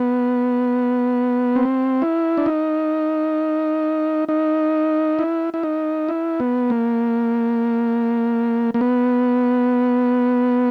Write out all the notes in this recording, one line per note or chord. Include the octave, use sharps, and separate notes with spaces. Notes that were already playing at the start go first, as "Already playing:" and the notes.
Already playing: B3
C4
E4
D4
D#4
D#4
E4
E4
D#4
E4
B3
A#3
A#3
B3